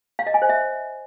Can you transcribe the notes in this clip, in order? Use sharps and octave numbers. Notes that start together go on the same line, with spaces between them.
F5
D#5
G#5
C5
E5